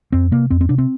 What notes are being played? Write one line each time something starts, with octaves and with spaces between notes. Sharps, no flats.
F2 C4
C3 A#3
F2 C4
C4
C3 D4
C4